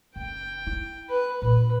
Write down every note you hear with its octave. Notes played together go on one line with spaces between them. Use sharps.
F#1 G5
E4
B4
A#2 D4 B4